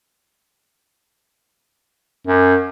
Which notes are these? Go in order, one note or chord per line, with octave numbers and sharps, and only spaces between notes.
F#2